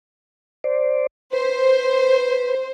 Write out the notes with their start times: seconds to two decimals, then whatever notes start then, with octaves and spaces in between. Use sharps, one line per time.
0.64 C5 D5
1.33 B4 C5